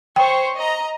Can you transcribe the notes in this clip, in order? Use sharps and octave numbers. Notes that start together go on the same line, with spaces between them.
C5 C#5 G5 C#6
D#5 A#5